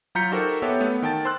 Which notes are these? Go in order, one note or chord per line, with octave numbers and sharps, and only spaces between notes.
F#3 F4 A#5 G6 B6 C#7
D#4 F#4 G4 A4 A#4 C5
B3 G4 A4 B4 C#5 E5
A3 B3
D#3 G5 A5 A6
C5 C6 E6 F#6